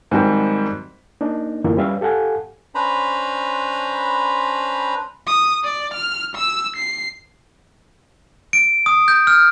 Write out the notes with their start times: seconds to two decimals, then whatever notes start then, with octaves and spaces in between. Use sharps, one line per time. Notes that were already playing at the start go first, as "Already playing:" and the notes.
0.11 G#2 D#3 F#3 G3 C4
1.21 A#3 D4 D#4
1.64 F#2 D3 E3 A#3 E4 F4
1.77 G3 C#4 B4 E5 F5
2.01 G4 A4 F5 F#5 G#5
2.75 C#4 D4 B4 C5 A#5 B5
5.27 D#6
5.64 D5
5.94 F6
6.35 E6
6.76 C7
8.53 D7
8.86 D#6
9.08 G6
9.27 F6